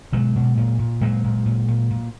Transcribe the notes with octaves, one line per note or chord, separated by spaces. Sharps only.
B2 F#3 G#3
B2
A#2
A#2
A#2 F#3 G#3
A#2
A#2
A#2
A#2